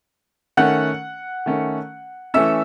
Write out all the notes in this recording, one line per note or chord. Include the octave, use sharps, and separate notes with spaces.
D#3 A3 C#4 F#5 F#6
D#3 A3 C#4
E3 A3 C#4 E5 E6